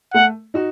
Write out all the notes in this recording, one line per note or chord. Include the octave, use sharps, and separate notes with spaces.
A3 F#5
D#4 F#4